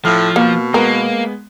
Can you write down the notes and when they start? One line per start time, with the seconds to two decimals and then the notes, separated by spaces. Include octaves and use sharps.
0.05 A2 F3 F6
0.36 B2 A#3
0.74 G#3 A#3 B3 A#4